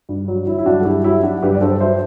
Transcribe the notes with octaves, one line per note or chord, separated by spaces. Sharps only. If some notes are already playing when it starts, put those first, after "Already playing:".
G2
F#3
F#3 E4
E4
G2 D4 F#4
A4
G2 E4 G4
F#3 E4 G4
F#3 D4 F#4
G2 G4 B4
D5
G2 A4 C5
F#3 C5 E5